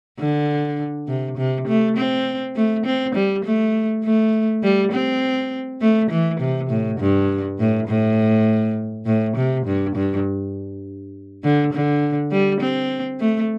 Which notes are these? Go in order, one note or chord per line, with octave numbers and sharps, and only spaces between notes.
D3
C3
C3
A3
C4
A3
C4
G3
A3
A3
G3
C4
A3
E3
C3
A2
G2
A2
A2
A2
C3
G2
G2
D3
D3
G3
C4
A3